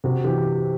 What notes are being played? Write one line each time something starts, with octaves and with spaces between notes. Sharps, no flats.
C3 F#4
E3 G4